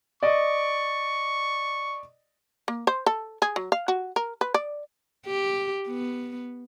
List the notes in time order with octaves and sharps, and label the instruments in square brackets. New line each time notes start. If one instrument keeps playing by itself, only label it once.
[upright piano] D5 D#5 [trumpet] C#6
[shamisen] A#3
C5
A4
G#4
F#3
F5
F#4
A#4
B4
D5
[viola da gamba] G4
B3